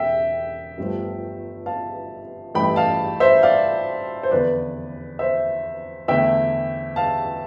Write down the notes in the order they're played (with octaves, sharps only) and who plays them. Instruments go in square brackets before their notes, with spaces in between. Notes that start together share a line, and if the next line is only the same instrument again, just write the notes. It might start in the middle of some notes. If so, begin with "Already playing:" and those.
Already playing: [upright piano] E1 E5 G5
G1 G2 F3 A3
F5 A5
A1 G2 E3 A3 G5 B5
F5 A5
C5 E5
D5 F5
C5
F1 E2 D3 B4 D5
C5 E5
E2 D3 A3 E5 G5
F5 A5